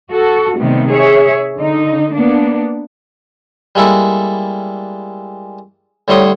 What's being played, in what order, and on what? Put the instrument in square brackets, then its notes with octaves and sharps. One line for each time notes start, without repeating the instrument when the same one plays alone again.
[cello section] F#4 A4
C3 D#3 G3 A3 B3
G#4 C#5 E5
D3 D#4
A#3 B3 D4
[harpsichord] G3 G#3 A#3 E4 A4
A2 D3 G3 C#5 C6 D#6